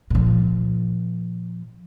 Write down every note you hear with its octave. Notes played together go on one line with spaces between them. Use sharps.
A#2 F3